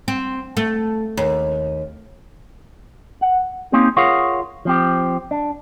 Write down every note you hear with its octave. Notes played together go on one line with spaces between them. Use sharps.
C4
A3
D#2
F#5
A#3 C4 C#4 D#4 G4
F4 G#4 A#4 C#5 F5 F#5
F3 C4 G4
D4